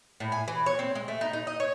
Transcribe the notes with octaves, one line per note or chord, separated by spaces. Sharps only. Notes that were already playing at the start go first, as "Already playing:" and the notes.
A2
G#5
E3
C#5
C4
G#3
A3
D#4
D#4
D#5
C#5